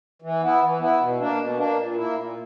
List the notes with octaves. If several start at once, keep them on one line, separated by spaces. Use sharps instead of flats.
E3
B3 E4
E3
B3 E4
B2
A#3 D4
B2
A#3 D4
A#2
A#3 E4
A#2